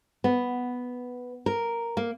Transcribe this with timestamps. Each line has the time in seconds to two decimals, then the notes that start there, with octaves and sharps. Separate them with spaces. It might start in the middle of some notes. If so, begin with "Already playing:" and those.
0.24 B3
1.46 A#4
1.97 A#3